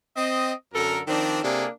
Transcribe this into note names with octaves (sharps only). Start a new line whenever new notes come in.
C4 D#5
F#2 D3 A4 A#4
D#3 F3 C4 D4
C3 A#3 D4 G#4 A4